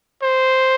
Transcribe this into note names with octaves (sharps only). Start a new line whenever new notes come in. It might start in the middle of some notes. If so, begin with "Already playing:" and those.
C5